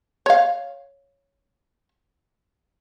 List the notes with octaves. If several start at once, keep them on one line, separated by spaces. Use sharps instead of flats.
C#5 F5